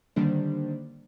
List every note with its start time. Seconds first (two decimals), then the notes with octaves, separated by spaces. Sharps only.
0.16 D3 D#3 G3 A#3 D4 C5